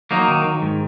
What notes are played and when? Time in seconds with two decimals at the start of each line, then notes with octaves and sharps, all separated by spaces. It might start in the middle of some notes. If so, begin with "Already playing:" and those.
0.11 F#3 A#3 D#4
0.28 D#3
0.45 D#3
0.62 G#2